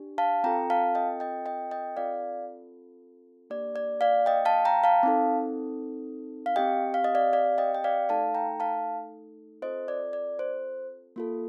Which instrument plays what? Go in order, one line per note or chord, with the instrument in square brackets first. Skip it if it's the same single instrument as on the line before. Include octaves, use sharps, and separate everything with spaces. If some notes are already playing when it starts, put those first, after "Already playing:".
Already playing: [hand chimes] D4 G4
F5 A5
C4 F4 A4 G5 A#5
F5 A5
D#5 G5
D#5 G5
D#5 G5
D#5 G5
C4 F4 A4 D5 F5
A#3 D4 G4 D5
D5
D5 F5
D#5 G5
F5 A5
G5 A#5
F5 A5
C4 D#4 A4
F5
C4 G4 D#5 G5
F5
D#5
D5 F5
D5 F5
D#5 G5
G5
D5 F5
A3 D#4 A4 F5 A5
G5 A#5
F5 A5
C4 F4 A4 C5 D#5
D5
D5
C5
A#3 F4 A4